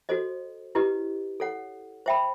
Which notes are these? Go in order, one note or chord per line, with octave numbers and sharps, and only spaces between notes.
F#4 A4 C5 D#5
E4 G4 B4 D#5
A4 C#5 F#5
C5 E5 G5 B5